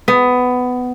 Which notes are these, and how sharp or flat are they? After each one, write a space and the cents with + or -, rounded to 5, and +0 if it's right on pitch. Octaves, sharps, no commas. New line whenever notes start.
B3 +15